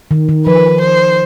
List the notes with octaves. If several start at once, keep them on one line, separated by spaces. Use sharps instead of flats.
D#3
D#3
F3 B4
C5